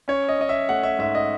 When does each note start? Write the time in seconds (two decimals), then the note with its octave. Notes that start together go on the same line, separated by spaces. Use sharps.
0.08 C#4 C#5
0.29 D#5
0.39 C#4 D#5
0.49 E5
0.69 A3 F#5
0.83 E5
0.99 G#2 E5
1.15 D#5